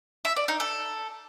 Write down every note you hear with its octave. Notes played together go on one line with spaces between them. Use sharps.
E5
D5
D#4
A4